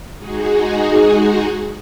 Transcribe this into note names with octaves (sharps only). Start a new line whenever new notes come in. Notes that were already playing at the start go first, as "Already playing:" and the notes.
G#3 D#4 F#4 G#4